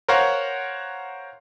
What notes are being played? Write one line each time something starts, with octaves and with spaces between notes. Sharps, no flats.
A#4 C5 C#5 F5 F#5 A#5